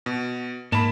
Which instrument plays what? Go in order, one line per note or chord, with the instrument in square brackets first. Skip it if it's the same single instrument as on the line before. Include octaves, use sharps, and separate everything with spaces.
[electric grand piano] B2
[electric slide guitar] G#2 A5 [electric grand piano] A#3 B5